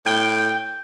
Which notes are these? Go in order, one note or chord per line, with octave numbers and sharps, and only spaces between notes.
A2 G5